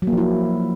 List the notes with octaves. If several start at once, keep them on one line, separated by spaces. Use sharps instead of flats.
F#3
A#3
F3
E4